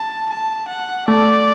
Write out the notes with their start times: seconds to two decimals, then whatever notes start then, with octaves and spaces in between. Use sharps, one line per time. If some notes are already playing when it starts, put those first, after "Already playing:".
Already playing: A5
0.30 A5
0.68 F#5
1.08 A3 D5